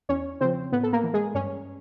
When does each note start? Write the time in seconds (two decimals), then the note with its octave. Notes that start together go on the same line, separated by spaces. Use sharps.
0.09 E2 C#4 C#5
0.41 C#3 F3 C4 C5
0.72 A2 B3 B4
0.83 A4
0.93 A#3 A#4
1.03 E3
1.14 G#3 G#4
1.34 G2 C#4 C#5